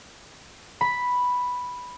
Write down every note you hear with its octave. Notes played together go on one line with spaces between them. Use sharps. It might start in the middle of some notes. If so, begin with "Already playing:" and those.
B5